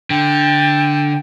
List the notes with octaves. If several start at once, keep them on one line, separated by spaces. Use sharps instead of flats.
D3 G5